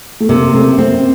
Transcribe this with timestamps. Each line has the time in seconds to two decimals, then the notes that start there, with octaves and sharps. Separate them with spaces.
0.20 A3
0.29 C3 A#3
0.53 A3 C4
0.78 A3 C4